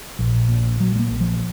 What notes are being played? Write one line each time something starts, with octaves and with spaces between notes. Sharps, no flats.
A#1
A#2
A#2 F#3
G#3
A#3
A#1
F3